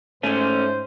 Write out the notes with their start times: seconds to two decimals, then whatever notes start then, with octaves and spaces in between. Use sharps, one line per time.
0.23 G#2 A3 C#4 C5